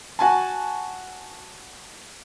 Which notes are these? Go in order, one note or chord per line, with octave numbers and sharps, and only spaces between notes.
F#4 G#5 A5